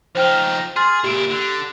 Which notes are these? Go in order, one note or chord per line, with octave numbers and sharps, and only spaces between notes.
F3 D#4 C5 G5 F6
G#4 C6 F6 A6
A#2 E4 G4 D7
D3